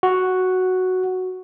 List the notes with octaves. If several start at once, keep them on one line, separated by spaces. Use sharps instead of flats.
F#4